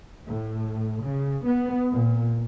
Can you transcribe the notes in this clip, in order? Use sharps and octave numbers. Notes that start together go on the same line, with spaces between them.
A2
C#3
B3
A#2